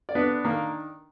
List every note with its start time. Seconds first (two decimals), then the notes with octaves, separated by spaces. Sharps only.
0.09 D5
0.15 B3 D4 B4
0.45 D#3 A#3 A#4